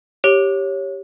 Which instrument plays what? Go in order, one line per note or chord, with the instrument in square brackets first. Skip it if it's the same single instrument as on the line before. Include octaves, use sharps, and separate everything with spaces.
[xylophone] G4 [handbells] C#5